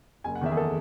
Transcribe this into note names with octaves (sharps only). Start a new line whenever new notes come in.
F#1 G#5
F#5
E2 D#3 E5
G#4
A4